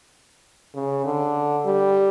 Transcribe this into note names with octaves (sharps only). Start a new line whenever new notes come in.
C#3
D3
G3